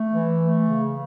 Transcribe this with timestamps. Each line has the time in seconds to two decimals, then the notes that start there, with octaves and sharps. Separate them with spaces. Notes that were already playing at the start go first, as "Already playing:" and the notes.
Already playing: A3
0.11 E3
0.39 A3
0.65 C#3